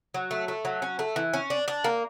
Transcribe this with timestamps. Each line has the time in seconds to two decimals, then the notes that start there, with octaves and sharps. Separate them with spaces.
0.14 F#3
0.31 A3
0.48 A3
0.65 F#3
0.82 C#4
0.99 A3
1.16 E3
1.34 C#4
1.50 D4
1.68 D4
1.84 A#3